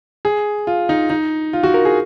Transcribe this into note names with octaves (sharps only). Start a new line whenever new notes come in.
G#4
F4
D#4
D#4
F4
F#4
A#4
G#4